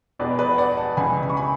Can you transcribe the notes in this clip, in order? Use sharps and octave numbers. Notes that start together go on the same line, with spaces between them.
E1 E2 B2 B4 D5
B4 D5
D5 F#5
F#5 A5
C#2 C#3 E3 G#5 B5
B5
C#6
G#5 B5